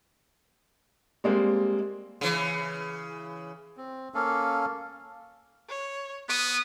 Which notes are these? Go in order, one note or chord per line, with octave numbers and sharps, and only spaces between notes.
G3 G#3 A#3 C4
C#3 E3
C4
A#3 C#4 A4 F5
C#5
B3 D#6